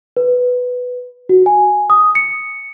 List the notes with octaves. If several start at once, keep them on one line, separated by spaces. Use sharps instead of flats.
B4
F#4
G#5
D#6
C#7